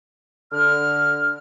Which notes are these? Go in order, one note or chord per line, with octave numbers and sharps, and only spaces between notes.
D3 F6